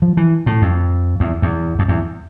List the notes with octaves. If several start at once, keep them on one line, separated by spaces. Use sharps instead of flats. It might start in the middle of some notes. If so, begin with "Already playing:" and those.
F3
E3
A2
F2
E2
E2
F2
E2